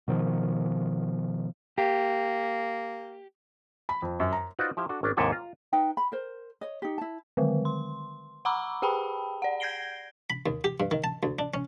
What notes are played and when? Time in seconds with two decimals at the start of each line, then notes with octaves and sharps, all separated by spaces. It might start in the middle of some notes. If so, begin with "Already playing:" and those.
0.08 B2 D#3 F3
1.78 A#3 G4
3.89 B5
4.02 F2
4.20 F#2
4.32 A#5
4.59 D#4 F4 F#4 B4 C5 D5
4.77 F3 E4 G4 C5 E5 F5
4.89 D4 F#4 A4
5.03 G#1 C#4 D4
5.17 D#2 G#2 C3 E4 A4 G#5
5.32 F4 A#5
5.73 D#4 B4 G5
5.97 B5
6.12 A#4 C5
6.61 C#5 D#5
6.82 D#4 G4
6.98 E4 A5
7.37 D3 D#3 G#3
7.65 C6
8.45 F#5 A#5 B5 C#6 D6 E6
8.82 G4 G#4 G5 A5 B5
9.42 D5 F#5
9.60 G6 G#6 A#6 C7 D7 G7
10.30 B5
10.46 D#2
10.64 G4
10.80 G2
10.91 D#3
11.04 A5
11.23 D2
11.39 D4
11.54 C#4